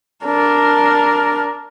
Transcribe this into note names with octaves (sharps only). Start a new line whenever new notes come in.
D4 A#4